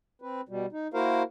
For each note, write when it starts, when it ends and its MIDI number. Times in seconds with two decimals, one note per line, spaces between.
0.22 0.41 60
0.22 0.41 71
0.49 0.66 47
0.49 0.66 55
0.72 0.87 63
0.94 1.23 58
0.94 1.23 64
0.94 1.23 66
0.94 1.23 70
0.94 1.23 72
0.94 1.23 77